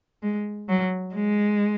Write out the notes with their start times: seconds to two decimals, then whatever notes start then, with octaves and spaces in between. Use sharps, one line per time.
0.23 G#3
0.69 F#3
1.15 G#3